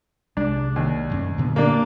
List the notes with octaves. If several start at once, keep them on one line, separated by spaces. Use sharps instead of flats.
C2 G#3 D4
D#2
D#1 F#2 C#4
A#2 D3 B3
A#3 D4